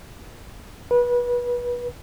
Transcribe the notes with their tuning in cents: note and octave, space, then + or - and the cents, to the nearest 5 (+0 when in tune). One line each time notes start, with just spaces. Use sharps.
B4 -25